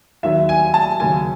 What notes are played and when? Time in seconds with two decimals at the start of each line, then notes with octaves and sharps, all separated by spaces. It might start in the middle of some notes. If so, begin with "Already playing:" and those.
0.23 D#2 D#3 F#3 E5
0.49 G#5
0.74 A5
1.00 D#2 C#3 F#3 G#5